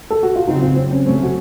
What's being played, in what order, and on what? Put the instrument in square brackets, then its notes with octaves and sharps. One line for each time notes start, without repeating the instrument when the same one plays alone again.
[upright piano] A4
F#4
F4
[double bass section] C#3 F#3 C4 [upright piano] D#4
[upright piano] F4
C4
C#4
[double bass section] C3 F#3 A3 C#4 [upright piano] C4
[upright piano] F#4